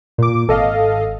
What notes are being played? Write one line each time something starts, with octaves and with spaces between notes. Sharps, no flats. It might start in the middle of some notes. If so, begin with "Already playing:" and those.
A#2 D6
G#1 A4 D#5 F5